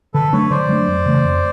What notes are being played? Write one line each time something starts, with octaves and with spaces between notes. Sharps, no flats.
D3 A4 B4
F#3 A3 D4 B4 C#5
D3 C5 D5
F#3 A3 D4
F2
C#3 E3 A3
F2